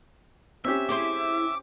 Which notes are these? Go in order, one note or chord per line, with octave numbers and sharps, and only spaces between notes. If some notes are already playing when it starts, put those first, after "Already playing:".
C4 C#4 G4 E5
E4 G#4 C5 D6